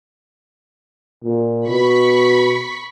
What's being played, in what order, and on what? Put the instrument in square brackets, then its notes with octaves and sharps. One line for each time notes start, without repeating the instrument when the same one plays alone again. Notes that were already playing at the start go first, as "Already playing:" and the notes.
[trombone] A#2
[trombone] B2 [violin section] B5 C#6 B6